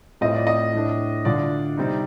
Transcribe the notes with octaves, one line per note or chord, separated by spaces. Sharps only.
A2 A3 C4 F4 D#5
D5
D#5
A2 A3 D4
D3 A3 D4 F4 D5
C3 G3 C4 D#4